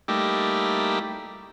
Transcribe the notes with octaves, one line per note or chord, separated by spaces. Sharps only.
G3 A3 A#3 D#4 E4 G4